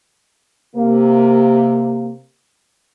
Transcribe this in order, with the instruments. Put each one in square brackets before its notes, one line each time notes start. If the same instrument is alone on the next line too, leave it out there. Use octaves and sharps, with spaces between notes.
[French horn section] C3 A#3